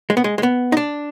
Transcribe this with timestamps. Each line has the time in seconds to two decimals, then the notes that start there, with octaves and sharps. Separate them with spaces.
0.10 G#3
0.17 B3
0.24 G#3
0.38 G#3
0.43 B3
0.72 D#4
0.77 D4